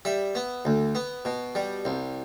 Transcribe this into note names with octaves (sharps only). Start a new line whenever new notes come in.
G3 E5
B3
D2
B3
B2
G3
C2